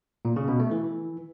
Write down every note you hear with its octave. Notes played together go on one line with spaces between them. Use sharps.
A#2
C#3
B2
A3
E3